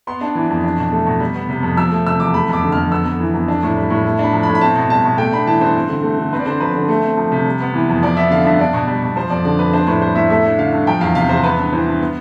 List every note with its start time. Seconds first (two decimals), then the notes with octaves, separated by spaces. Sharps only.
0.07 B3 C6
0.21 D4
0.35 E3
0.49 F2
0.64 D4
0.78 B2
0.92 A3
1.06 B2
1.20 G3
1.34 B3
1.49 C3
1.63 F2
1.77 F3 E6
1.91 A3
2.06 C3 E6
2.20 E2 D6
2.34 A3 B5
2.49 F2 D6
2.63 D3
2.72 F2 F6
2.91 B3 E6
3.06 F2
3.20 E3
3.34 F2
3.48 D4
3.63 A2
3.77 G3
3.90 A2
4.04 A3
4.19 D4 B5
4.33 F3
4.43 B5
4.48 A2
4.55 B5
4.61 C4 A5
4.76 B2
4.90 G3 A5
5.05 B2
5.18 A3 G5
5.32 D4 B5
5.46 E3 A5
5.61 G2 C5
5.76 C4
5.89 D3
6.03 A3
6.18 D3
6.33 C4 B4
6.39 D5
6.46 D3 C5
6.60 F3 B4
6.74 D3 C5
6.88 A3
7.03 C4
7.17 F3
7.32 C3
7.45 G3
7.61 B3
7.74 E3
7.89 F2
8.03 F3 D5
8.17 B3 E5
8.31 D3 F5
8.45 G2 E5
8.59 D4 D5
8.73 B2
8.87 G3
9.02 B2
9.16 F3 C5
9.30 F2 D5
9.45 D3 D5
9.58 F2 B4
9.73 D4 C5
9.87 A2 B4
10.01 G3 C5
10.15 A2 E5
10.30 A3 E5
10.45 D4
10.58 D3 F5
10.72 G2
10.87 F3 G5
11.01 E2 F5
11.15 C3 F5
11.29 E2 C5
11.43 B3 B4
11.58 G2
11.73 E3 C5
11.87 G2
12.01 B3